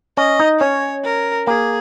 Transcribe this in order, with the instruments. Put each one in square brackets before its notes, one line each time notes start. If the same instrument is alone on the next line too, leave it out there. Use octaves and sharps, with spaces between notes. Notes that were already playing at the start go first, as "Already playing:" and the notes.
[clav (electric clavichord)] C#4 [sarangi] D#5
[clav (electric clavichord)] D#4
[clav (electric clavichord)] C#4 [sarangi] C#5
[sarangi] A#4
[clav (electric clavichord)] A#3 [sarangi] G#4